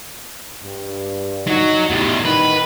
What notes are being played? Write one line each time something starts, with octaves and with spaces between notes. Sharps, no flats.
G2
F#3 D#4 F#4
E2 A2 G3
D#3 B4